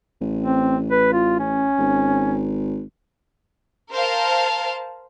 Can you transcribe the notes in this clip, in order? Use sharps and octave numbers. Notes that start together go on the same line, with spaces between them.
A1
C4
B4
F4
C#4
G#1
A#4 C5 F5 A5